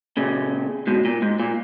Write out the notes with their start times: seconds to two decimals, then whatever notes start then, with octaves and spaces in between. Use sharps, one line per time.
0.17 A#2 C#3
0.87 G#2 B2
1.05 A#2
1.22 G#2
1.40 A#2